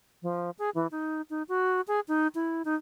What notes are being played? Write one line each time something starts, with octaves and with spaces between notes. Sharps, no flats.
F3
G#4
E3
D#4
D#4
F#4
G#4
D#4
E4
D#4